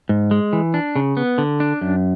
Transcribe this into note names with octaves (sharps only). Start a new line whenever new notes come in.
G#2
G#3
E3
D4
C#3
B3
D3
D4
F#2